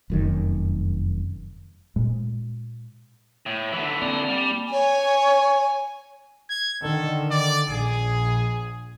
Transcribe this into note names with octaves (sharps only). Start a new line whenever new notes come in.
F1 F#2 D#3
A#2 G#3
A2
D3 E3 E5
A#3 C4 D5 A5
G3
C#5 G#5
G#6
D3 D#3 A4
D5
A#1 G#4